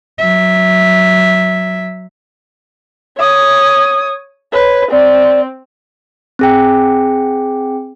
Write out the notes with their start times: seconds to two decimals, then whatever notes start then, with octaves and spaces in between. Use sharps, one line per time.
0.19 F#3 E5
3.18 C#5 D#6
4.53 B4 C#5
4.91 C4 D5
6.39 C4 G#4 G5